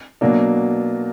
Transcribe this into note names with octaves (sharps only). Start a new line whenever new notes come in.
B2 F#3 A#3 D4